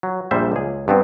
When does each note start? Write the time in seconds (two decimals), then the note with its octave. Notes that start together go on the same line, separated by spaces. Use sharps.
0.03 F#3
0.31 A#1 A#2 G3 C5 E5
0.52 C#2 G#4
0.88 G2 B3 C4